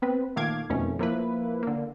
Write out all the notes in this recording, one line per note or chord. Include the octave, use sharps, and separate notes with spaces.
B3 C4 B4
A#2 D#3 A3 F5 D6 G#6
F2 B2 D#3 A3 C#4
F3 A#3 E4 B4
D3 A#3